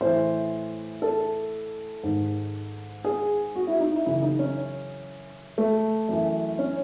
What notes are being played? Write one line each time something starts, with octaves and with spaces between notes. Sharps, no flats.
A2 E3 C5
A4
G#2 D#3
G#4
F#4
E4
D#4
E4
F#2 C#3 E3 E4
D#4
C#4
A3
F#2 E3
C#4